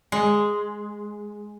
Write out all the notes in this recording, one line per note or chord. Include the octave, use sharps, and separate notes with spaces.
G#3